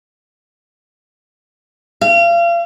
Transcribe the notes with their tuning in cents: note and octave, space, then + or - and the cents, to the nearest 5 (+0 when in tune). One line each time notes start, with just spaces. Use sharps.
F5 -35